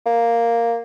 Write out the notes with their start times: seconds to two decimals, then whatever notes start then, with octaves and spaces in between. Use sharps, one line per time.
0.06 A#3